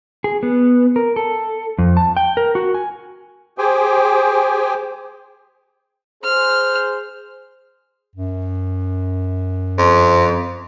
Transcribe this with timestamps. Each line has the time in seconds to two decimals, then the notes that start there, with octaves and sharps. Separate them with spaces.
0.24 G#4
0.43 B3
0.96 A#4
1.16 A4
1.79 F2
1.97 A5
2.17 G5
2.37 A#4
2.55 F#4
2.75 G#5
3.58 G4 G#4 C5 G5 G#5
6.24 G#4 C5 F6
8.16 F#2
9.78 F2